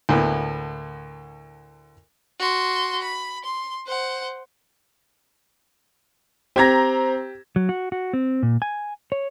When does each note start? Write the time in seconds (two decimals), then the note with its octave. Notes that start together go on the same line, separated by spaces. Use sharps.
0.09 D2 A2 A#3 B3
2.39 F#4 C6
3.02 B5
3.45 C6
3.86 C5 F#5
6.56 C4 G4 A#5 G#6 A#6
7.56 F#3
7.69 F#4
7.92 F#4
8.13 C4
8.43 A#2
8.62 G#5
9.12 C#5